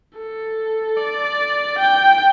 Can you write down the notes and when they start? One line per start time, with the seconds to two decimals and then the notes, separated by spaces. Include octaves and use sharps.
0.18 A4
0.97 D5
1.79 G5